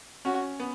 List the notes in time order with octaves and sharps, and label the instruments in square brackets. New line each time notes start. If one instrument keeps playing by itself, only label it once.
[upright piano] C#4 [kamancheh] F#4
[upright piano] B3